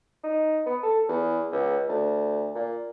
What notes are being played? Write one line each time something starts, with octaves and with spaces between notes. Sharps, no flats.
D#4
B3
A4
E2
C#2
D2
A#2